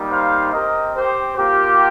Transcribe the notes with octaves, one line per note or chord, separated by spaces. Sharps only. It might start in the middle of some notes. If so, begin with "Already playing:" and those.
Already playing: G3 A#3 D#4
C5 F5
C4 G4 A#4 D#5
G4 C5
A#3 F4 G4